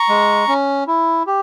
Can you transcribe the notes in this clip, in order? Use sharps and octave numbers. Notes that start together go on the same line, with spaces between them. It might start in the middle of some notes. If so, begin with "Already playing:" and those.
Already playing: A#5 C#6
G#3
C#4
E4
G4